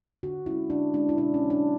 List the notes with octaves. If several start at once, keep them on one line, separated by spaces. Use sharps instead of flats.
D3 F#4
G#3 C#4 E4
D3 D4
G#3 C#4 D4
E4
B2 D4
C#4
F#3 B3
D4